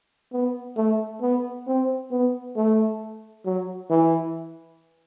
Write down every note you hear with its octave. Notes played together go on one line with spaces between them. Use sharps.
B3
A3
B3
C4
B3
A3
F#3
E3